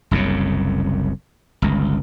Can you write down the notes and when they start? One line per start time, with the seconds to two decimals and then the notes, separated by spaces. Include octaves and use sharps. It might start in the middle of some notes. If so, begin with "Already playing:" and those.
0.11 F#1 C2 F#2 C#3
1.62 G1 C#2